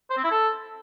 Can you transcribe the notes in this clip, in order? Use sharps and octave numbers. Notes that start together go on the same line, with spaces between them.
C5
C4
E4
A4